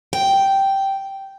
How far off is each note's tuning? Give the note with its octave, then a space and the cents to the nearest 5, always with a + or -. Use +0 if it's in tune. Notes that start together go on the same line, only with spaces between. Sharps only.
G5 -5